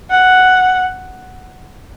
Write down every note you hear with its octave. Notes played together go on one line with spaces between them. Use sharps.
F#5